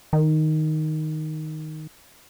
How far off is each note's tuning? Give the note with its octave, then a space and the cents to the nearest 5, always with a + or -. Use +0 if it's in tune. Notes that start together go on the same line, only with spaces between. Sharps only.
D#3 +0